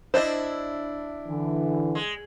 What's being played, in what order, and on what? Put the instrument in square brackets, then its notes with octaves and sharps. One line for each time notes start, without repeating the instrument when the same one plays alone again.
[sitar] D4 E4 [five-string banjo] C5 D#5
[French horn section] D3 E3
[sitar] G#3